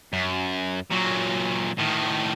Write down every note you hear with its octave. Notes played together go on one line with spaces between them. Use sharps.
F#2
A#2 F#3
A2 D#3